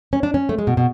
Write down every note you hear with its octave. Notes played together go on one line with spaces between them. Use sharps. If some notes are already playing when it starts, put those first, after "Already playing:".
C#4
D4
C#4
A3
G#3
B2
B2